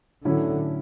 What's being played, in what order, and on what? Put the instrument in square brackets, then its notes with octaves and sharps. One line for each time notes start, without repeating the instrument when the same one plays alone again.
[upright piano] A2 F#3 C#4 E4 [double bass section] D3